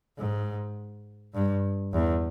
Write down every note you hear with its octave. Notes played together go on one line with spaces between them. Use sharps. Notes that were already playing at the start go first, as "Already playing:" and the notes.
G#2
G2
E2